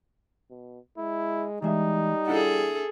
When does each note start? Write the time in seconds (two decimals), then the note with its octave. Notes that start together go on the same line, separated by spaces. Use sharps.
0.50 B2
0.98 G#3 E4
1.62 E3 G3 G#3 D#4 E5
2.28 D4 E4 G#4 A4 F#5